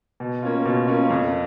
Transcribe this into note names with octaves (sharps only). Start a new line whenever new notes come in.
B2
A#3 C#4 F4
B2
A#3 C#4 F4
F2